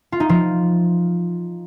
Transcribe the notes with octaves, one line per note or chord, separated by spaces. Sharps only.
F4
D#4
F3 F4